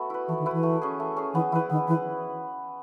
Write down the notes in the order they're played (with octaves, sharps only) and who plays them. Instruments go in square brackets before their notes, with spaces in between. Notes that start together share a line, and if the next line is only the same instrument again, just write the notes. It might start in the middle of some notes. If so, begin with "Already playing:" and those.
Already playing: [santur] A3 B3 F#4
E4 B4
[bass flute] E3 [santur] A3
[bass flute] D#3
[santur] E4 B4
[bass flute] E3
[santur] A3
C#4 G#4
A3
C#4 G#4
[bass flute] E3 [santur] B3
[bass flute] E3 [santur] E4
[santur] B4
[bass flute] D#3 [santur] B3
[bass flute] E3 [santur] E4
[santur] B4